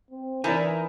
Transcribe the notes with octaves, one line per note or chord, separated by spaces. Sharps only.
C4
E3 D#4 E4 A#4 D5 G#5